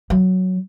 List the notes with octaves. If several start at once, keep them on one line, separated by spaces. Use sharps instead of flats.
F#3